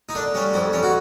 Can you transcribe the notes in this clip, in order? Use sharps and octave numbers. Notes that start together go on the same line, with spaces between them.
D#4
D3 D4
G3 C#4
F2 C4
F2 C#4
F#4